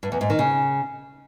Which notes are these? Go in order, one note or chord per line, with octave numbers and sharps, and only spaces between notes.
G2
E2
G#2
D#3
C#3